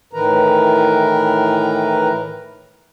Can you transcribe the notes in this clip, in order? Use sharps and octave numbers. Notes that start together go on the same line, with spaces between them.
A2 D#3 E3 A#4 B4 A#5